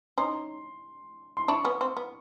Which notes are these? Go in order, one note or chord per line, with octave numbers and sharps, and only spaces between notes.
C#4 D#4 C6
C6
D4 E4 C#6
B3 C#4
C4
B3